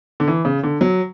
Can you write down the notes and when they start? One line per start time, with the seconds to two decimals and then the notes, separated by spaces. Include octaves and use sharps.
0.20 D3
0.28 E3
0.45 C#3
0.63 D3
0.81 F#3